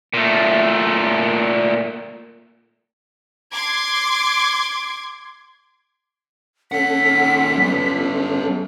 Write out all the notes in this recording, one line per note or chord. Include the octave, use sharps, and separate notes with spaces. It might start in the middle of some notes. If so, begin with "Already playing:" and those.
A#2 A3
C6 D6 G#6
D#2 C#4 A4 F#5 B6
G3 B3